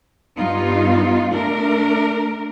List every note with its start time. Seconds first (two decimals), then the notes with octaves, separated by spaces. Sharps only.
0.37 G2 B3 D#4 F4
1.31 A3 D4 A#4